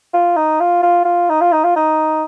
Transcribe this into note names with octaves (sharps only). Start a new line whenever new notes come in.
F4
D#4
F4
F4
F4
D#4
F4
D#4
F4
D#4